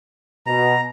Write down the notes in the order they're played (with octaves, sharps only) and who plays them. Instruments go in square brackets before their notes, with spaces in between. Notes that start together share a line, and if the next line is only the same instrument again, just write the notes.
[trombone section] B2 [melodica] A#5